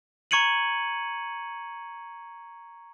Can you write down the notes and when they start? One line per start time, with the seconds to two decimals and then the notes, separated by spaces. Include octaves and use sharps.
0.31 A#5 C#6 G#6 C#7 D#7 F#7